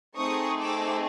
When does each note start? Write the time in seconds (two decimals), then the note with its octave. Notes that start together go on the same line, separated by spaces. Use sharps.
0.16 A3 C4 D#4 G#4 C#6 D#6
0.59 D6 E6